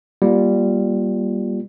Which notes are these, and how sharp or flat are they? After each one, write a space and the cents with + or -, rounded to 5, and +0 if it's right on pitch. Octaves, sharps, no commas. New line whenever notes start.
G3 +0 A#3 +30 F4 +0